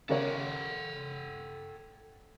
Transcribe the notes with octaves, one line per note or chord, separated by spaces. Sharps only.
C#3 A4 A#4 C#5 F#5 G5